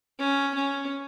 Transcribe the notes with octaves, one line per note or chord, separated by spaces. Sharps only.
C#4
C#4